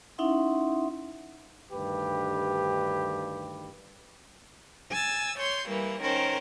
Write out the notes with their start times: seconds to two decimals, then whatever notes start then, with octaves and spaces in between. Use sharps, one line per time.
0.18 C#4 D#4 E4 E5 F#5 C6
1.72 D2 G2 D#3 G4 B4
4.91 G#5 E6 A6
5.38 C#5 C6 G6
5.67 E3 G3 A#3
6.01 D#3 C#4 A#4 C5